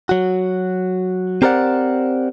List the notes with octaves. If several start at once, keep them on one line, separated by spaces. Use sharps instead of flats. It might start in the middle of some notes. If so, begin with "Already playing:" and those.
F#3 F#4
C4 G4 A#4 C5 D5 F#5